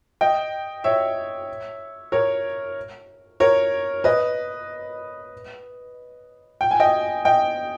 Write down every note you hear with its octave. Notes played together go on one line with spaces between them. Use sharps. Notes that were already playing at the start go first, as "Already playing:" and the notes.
D#5 G5
C#5 E5
A#4 C#5
A#4 C#5
B4 D#5
G5
G#5
D#5 G5
D#5 G5